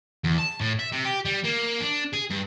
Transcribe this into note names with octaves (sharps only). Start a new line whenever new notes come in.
E2
A5
A2
E5
C3
G4
G3
A#3
D4
G#4
G2